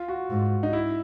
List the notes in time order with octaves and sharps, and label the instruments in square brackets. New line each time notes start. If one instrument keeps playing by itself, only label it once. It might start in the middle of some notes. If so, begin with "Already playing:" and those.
Already playing: [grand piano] F4
F#4
[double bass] G#2
[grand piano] D#4
E4